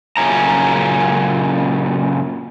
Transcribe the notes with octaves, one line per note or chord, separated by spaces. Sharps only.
F#2 A#2 C#3 C#4 A#5